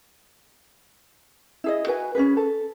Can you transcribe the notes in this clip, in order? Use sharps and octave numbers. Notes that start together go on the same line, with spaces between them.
E4 G#4 D#5
F#4 B4 G#5
C#4 D4 G#4 B4
A4